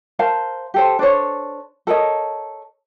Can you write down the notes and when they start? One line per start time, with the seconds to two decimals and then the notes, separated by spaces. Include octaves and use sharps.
0.19 A#4 C5 F5 A5
0.74 G4 A4 C5
0.99 D4 A4 C5 C#5
1.87 A4 A#4 C#5 D#5